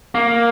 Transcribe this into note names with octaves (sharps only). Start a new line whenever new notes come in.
A#3